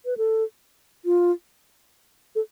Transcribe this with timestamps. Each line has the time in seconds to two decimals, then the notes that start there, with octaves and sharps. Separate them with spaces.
0.05 B4
0.17 A4
1.05 F4
2.35 A4